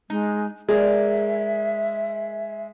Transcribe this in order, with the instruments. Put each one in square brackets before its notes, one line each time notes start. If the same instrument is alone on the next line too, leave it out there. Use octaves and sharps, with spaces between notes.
[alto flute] G#3 [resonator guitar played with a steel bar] D#4
[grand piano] G#3 [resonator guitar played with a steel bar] G#4 A#4 D5 [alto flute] E5